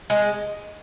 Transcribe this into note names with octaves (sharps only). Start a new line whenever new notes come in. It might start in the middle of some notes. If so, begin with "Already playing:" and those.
G#3